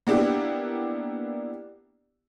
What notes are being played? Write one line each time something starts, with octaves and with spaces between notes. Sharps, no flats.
A#3 B3 D4 E4 G4